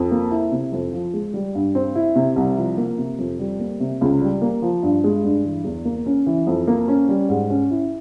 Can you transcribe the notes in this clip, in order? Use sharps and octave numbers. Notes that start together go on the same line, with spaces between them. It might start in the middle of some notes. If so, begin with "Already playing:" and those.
Already playing: F2
A#3
E4
C3
F2
F3
G#3
G3
G2
C4
E4
C3
C2
F3
A#3
C3
F2
G3
A#3
C3
C#2
G3
A#3
F3
G2
G#3
G2
E3
E2
A#3
C#4
E3
F2
A#3
C#4
G3
G#2
C#4
E4